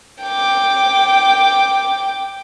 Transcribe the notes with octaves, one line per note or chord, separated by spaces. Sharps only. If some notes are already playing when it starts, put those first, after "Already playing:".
G5 D6